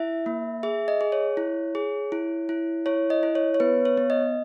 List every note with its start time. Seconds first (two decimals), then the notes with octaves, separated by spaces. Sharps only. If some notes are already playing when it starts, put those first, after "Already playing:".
Already playing: E4 E5
0.26 A#3
0.63 G#4 E5
0.88 D#5
1.01 G#4
1.12 C#5
1.37 E4
1.75 G#4
2.12 E4
2.49 E4
2.86 E4 C#5
3.10 D#5
3.23 E4
3.35 C#5
3.54 C#5
3.60 B3 B4
3.85 C#5
3.97 B3
4.10 D#5